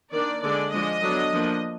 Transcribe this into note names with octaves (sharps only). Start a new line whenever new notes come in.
D#3 A#3 D4 D5
D3 G#3 D4 D5
F3 G#3 D4 D#5
D3 F#3 B3 D4
F3 A#3 D4